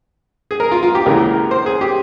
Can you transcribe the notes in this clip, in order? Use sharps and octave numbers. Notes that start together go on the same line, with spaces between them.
G#4
A#4
F4
F4
G4
C#2 C#3 E3 A#3 A#4
C5
G#4
G4